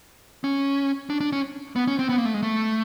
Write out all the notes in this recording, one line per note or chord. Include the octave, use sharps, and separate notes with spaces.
C#4
D4
D4
C#4
B3
C#4
C4
B3
A#3
A3
G#3
A3